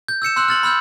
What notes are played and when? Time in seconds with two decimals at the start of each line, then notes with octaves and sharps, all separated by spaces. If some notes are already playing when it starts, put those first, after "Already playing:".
0.08 G6
0.22 E6 G6 C#7 E7
0.36 C6 E6 F#6 F#7
0.48 F6 A6 F#7
0.63 B5 E6 F6 G6